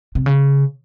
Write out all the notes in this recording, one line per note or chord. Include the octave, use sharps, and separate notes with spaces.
C3
C#3